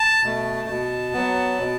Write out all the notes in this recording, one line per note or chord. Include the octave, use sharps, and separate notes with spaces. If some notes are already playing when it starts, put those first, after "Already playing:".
Already playing: A5
B2 A3
B2
F#3 B3
B2